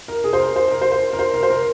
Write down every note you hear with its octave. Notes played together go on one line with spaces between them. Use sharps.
A#4
G#4
C5
A#4
C5
A#4
C5
C5
A#4
C5
A#4
C5
A#4